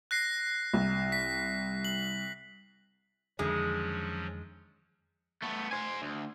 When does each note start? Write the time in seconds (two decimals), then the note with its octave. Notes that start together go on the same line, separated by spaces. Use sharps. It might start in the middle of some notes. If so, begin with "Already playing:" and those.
0.11 F#6 A#6 C7
0.74 C2
1.12 B6
1.85 F#7
3.39 F2 D3 D#3 F3 F#3 G#3 C#4
5.42 A3 B3
5.71 C5 G#5
6.02 D2